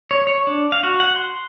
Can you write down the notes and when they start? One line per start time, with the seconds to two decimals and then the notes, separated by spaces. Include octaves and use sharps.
0.11 C#5
0.27 C#5
0.47 D4
0.72 F5
0.83 F#4
1.00 F#5
1.16 C6